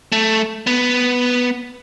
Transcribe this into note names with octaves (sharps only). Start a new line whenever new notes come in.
A3
B3